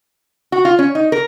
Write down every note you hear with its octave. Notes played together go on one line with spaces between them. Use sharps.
F#4
F4
C#4
D#4
A#4